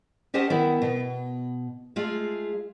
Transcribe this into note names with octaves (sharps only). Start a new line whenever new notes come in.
C#4 G4 C5 D#5 F#5 A5
D#3 B3 E4
B2
G#3 A3 F4 G#4